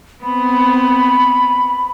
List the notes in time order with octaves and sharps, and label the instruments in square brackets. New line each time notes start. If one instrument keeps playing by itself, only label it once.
[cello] B3 C4 [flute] B5